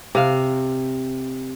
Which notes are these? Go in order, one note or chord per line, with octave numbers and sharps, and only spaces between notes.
C3 F5